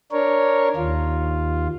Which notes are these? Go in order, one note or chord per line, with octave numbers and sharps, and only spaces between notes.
D4 A#4 C#5
D#2 F4